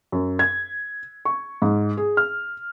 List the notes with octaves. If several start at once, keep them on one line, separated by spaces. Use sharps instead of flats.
F#2
G#6
C#6
G#2
G#4
F6